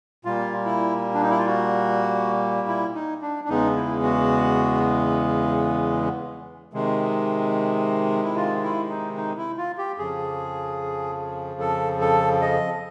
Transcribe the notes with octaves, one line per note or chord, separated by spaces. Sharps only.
A#2 G3 A#3 F4
E4
D4
D#4
E4
F4
F#4
E4
D#4
D4
D4
E2 C#3 E3 G#3 B3 D#4
E4
F#4
C3 D#3 G#3
E4
F4
E4
D#4
D#4
E4
F4
G4
F2 C#3 F3 G#4
A4
A4
D#5